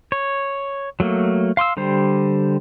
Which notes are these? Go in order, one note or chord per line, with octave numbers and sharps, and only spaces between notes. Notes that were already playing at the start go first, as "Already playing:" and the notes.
C#5
F#3 A3 A#3
F5 C6 D6 E6
D3 G3 G4 C5